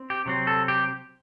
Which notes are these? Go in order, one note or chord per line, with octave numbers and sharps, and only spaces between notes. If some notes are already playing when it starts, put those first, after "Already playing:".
Already playing: C4
G4
C3 F#3 C4
A4
G4